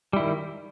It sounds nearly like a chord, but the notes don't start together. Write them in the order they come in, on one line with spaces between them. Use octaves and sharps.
G3 E4 D#3